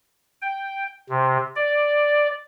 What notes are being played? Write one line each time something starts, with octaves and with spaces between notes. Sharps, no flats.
G5
C3
D5